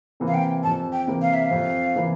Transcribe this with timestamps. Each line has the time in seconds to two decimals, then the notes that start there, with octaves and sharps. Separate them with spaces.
0.20 C3 E3 A#3
0.28 F5
0.34 G5
0.63 F2 A5
0.92 G5
1.07 C3 E3 A#3
1.22 F5
1.34 E5
1.46 F5
1.51 F2
1.95 C3 E3 A#3